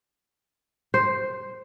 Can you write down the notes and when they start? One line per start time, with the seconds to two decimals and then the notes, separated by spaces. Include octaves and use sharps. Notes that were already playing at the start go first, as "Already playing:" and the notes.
0.94 C5